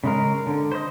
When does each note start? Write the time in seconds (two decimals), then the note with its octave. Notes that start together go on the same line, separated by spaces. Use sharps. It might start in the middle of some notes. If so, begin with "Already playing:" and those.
0.04 C#3 G#3 A#4
0.47 D3
0.72 C5 D#5